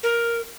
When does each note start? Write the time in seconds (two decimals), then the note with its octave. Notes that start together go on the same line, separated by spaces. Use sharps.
0.03 A#4